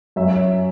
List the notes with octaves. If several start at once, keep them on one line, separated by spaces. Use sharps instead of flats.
F#2 E5